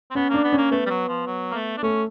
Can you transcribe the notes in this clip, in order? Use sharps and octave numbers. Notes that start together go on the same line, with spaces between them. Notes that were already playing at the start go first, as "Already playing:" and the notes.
C4
B3 C#4
A#3 D4
B3
A#3 C#4
A3 B3
G3
F#3
F3
F#3
A#3
A3
D4
A3 C#4